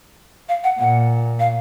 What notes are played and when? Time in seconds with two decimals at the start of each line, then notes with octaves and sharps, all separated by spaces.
0.49 F5
0.64 F#5
0.79 A#2 F#5
1.40 F5